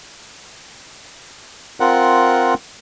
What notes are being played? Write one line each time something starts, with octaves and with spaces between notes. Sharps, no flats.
C4 F4 A#4 F#5